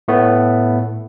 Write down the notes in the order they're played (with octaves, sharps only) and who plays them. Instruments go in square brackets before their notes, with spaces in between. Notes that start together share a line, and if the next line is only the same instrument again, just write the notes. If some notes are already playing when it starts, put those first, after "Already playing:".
[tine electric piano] A2 A3 B3